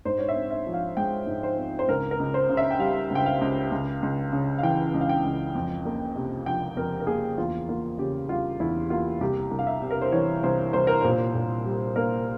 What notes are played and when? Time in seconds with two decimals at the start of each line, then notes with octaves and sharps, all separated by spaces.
0.05 G#2 C5
0.18 C#5
0.29 E5
0.36 C4
0.51 E5
0.67 F3
0.74 F5
0.97 G#3 G5
1.27 G#2
1.43 C5
1.57 C4
1.79 C5
1.88 C#2 A#4
2.11 A#4
2.19 C#2
2.34 C5
2.49 C#3
2.57 E5
2.71 G5
2.79 G3 F5
3.10 C#2
3.15 G5
3.26 F5
3.41 C#2
3.71 C#2
4.02 C#2
4.32 C#3
4.58 F5
4.63 E3 G5
4.94 C#2
5.01 F5
5.09 G5
5.24 C#2
5.55 F2
5.85 A#3
6.16 C3
6.46 F3 G5
6.77 F2 A#4
7.00 A#4
7.07 A#3 G#4
7.38 E2 F4
7.69 A#3 F4
7.98 C#3 G4
8.29 G3 F4
8.60 E2 E4
8.90 A#3 F4
9.21 C2 G4
9.51 C2
9.59 F5
9.67 E5
9.82 C3
9.91 A#4
10.02 C5
10.12 E3 C#5
10.43 C2 C5
10.73 C2 C5
10.87 A#4
11.01 A#2 C5
11.34 A#2
11.65 G3
11.96 A#3 A#4